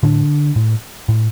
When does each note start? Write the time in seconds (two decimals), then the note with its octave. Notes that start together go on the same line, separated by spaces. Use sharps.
0.03 A2 D3 D4
0.56 A2
1.08 A2